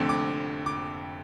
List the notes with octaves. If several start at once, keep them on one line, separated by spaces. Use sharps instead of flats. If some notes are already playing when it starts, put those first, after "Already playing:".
Already playing: F1 F2 D3 A3 C4
D6
D6